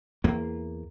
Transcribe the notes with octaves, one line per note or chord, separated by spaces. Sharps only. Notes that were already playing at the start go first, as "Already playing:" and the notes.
E2 A#3